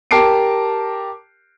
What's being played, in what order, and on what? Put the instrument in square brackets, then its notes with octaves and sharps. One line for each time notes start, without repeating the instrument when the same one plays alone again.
[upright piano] G4 A#4 A5 D6 C7 D7